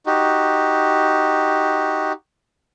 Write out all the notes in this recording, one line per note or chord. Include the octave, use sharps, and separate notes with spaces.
D#4 F#4 G4